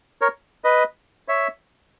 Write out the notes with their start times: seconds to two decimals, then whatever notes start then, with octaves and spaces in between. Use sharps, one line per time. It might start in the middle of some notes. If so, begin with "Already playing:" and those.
0.21 A#4 C#5
0.64 B4 D#5
1.28 C#5 E5